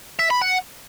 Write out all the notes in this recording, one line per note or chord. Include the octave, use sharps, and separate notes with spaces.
E5
B5
F#5